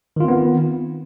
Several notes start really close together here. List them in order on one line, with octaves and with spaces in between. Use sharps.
D#3 F4 C4 B3